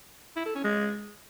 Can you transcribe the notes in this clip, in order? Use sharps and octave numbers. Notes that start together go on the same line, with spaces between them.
E4
A4
C#4
G#3